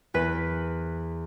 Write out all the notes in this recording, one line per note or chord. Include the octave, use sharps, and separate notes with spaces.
E2 B4 B6